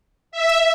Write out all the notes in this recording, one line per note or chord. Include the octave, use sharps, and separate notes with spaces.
E5